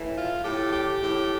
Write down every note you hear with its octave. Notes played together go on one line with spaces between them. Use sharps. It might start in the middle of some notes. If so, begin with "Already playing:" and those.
Already playing: A2 E3
F4
A2 E3 G4
G4
A2 E3